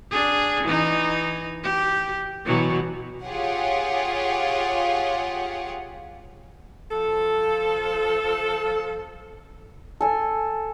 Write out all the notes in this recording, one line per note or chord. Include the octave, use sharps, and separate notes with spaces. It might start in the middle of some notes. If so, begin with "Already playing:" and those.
D4 G#4
E3 D#4
G4
B2 E3 F#3
F4 G4 G#4 C#5 F#5
F3 A4
A4 G#5